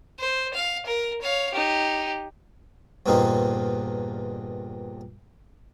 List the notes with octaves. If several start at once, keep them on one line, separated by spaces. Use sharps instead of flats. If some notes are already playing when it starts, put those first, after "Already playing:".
C5
F5
A#4
C#5 F5
D#4 G4
E2 G2 A#2 D3 C4 D#4